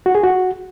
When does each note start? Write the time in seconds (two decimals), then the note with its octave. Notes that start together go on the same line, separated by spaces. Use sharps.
0.06 F#4
0.15 G#4
0.24 F#4